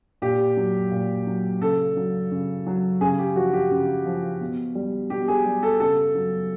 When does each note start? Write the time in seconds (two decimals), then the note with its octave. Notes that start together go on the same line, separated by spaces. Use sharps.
0.22 A#2 G4
0.57 F#3
0.91 A#2
1.27 F#3
1.61 C#3 A4
1.96 F#3
2.31 C#3
2.66 F#3
3.01 C#3 G#4
3.19 G4
3.36 F3 F#4
3.53 G4
3.71 C#3
4.06 F3
4.40 B2
4.75 G3
5.10 B2 G4
5.28 G#4
5.45 G3
5.63 A4
5.80 C#3 A4
6.15 F#3